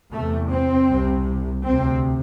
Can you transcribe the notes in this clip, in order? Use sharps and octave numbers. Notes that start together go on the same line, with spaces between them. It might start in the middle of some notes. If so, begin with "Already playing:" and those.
E2 C3 A3
C4
C2 C3
D2 C3 C4